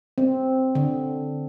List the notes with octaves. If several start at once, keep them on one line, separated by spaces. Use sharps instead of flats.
C4
D3